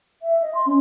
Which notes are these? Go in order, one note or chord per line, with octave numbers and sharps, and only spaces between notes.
E5
D#5
C6
C#4